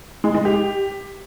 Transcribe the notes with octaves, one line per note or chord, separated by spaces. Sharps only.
G#3
G#3
G4